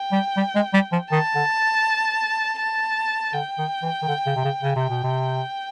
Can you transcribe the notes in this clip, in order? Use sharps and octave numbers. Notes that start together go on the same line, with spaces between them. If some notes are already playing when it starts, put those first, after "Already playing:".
Already playing: G5
G3
G3
G#3
G3
F3
D#3 A5
D3
A5
D3 G5
D#3
E3
D#3
D3
C#3
C3
C#3
C#3
C3
G5
B2
C3